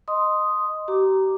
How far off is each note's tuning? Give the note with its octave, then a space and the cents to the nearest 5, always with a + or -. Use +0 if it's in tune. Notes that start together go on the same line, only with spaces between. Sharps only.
D#5 -5 C6 +0 D#6 +0
G4 -40 A#5 +0 D6 +0